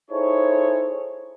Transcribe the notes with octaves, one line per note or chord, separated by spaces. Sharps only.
D#4 E4 G#4 A4 C5 C#5